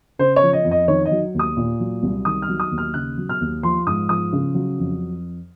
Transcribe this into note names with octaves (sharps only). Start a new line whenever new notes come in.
C#3 C5
C#5
F3
D#5
F2
D#5
D#3 C#5
D#5
F#3
D#2
D#6
A#2
F#3
C2
D#3 D#6
F6
F#3
D#6
D#2
F6
C#3 F#6
F#3
F6
D#2
F3 C6
G#2 D#6
F3 D#6
C#3
F#3
F2